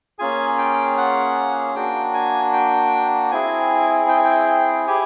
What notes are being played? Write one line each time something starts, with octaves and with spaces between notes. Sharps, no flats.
A#3 C#4 F4 G#4 G#5
G5
F#5
A#3 D4 F#4 G5
G#5
G5
C4 E4 G#4 G#5
G5
G#5
G5
E4 G4 G#5